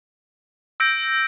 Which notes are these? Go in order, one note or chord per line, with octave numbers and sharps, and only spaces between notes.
E6 G6 A#6 D7